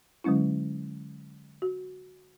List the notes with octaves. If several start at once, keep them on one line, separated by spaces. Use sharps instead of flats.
D3 F#3 G#3 C#4 E4
F#4